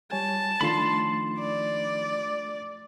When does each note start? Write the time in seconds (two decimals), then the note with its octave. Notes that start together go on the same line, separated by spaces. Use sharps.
0.12 G3 C#5 G#5 A5
0.61 D#3 F3 A3 D4 F4 B5 C6
1.40 D5